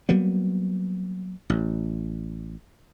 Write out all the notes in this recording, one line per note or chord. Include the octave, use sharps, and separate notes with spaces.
F#3 G3 A#3 B3
A1